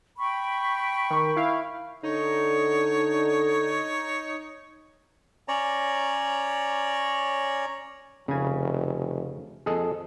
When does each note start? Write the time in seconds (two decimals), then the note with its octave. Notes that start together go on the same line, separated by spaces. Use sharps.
0.17 G5 B5 C#6
1.10 D#3
1.36 E4 F5
2.03 D3 D#4 C#5
5.48 C#4 C#5 D5 A#5
8.28 F1 C#3 G#5
9.66 F2 G#4 A4 D#5